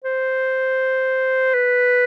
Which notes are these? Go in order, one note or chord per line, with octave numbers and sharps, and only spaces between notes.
C5
B4